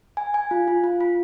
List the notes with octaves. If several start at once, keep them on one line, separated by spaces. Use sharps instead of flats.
G#5
G#5
F4
F4
F4
F4